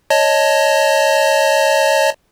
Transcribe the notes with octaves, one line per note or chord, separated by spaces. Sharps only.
C#5 D#5 A5